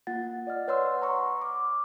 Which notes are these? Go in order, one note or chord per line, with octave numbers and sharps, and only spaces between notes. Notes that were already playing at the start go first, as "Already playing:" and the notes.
A#3 F4 F#5 A6
D5 D#5 F6
B4 C#5 F#5 C6 E6
A#5 C6 C#6
D6 F6